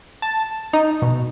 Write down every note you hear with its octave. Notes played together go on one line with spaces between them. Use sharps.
A5
D#4
B2